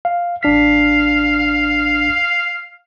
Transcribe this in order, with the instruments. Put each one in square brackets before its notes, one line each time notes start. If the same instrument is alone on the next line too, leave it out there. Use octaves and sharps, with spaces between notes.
[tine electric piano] F5
[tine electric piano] A1 D4 B6 [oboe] F5